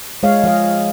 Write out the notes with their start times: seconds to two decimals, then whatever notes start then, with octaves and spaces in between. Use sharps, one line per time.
0.23 G#3 C#5 F5
0.44 F3 D#5 F5